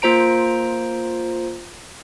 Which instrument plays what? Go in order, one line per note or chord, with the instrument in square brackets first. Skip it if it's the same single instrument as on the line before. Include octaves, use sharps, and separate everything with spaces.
[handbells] A#3 F4 C5 A#5 D7